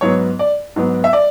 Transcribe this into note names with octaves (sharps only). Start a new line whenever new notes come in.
G#2 F#3 B3 C#5
D5
G#2 F#3 B3
E5
D5